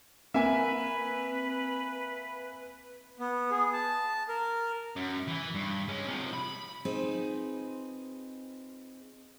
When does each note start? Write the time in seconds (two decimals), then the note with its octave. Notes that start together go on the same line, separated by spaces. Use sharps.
0.34 A#3 C4 B4 E5 G#5
3.19 B3
3.51 G#4
3.73 A5
4.29 A#4
4.96 F#2
5.27 E3
5.54 G2
5.88 G#3 C#4
6.07 C3 F3
6.33 B5
6.85 C4 D#4 F4 G#4 B4